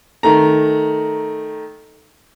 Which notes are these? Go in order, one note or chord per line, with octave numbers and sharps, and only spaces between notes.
D#3 A3 A#5